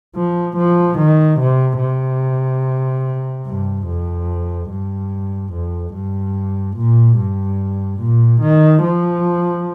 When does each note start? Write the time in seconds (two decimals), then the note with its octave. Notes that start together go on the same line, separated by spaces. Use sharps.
0.16 F3
0.57 F3
0.98 D#3
1.40 C3
1.81 C3
3.46 G2
3.88 F2
4.70 G2
5.53 F2
5.94 G2
6.76 A#2
7.18 G2
8.01 A#2
8.41 D#3
8.83 F3